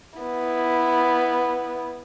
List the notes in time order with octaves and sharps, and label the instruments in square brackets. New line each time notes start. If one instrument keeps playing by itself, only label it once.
[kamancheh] B3 E4